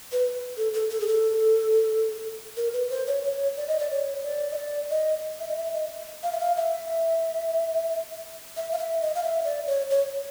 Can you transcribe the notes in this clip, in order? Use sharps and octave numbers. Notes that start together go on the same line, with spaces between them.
B4
A4
A4
A4
G#4
A4
A#4
B4
C5
C#5
C#5
D5
D#5
D5
C#5
D5
D#5
D5
D#5
E5
D#5
E5
D#5
F5
E5
F5
E5
E5
F5
E5
D#5
F5
E5
D5
C#5
C#5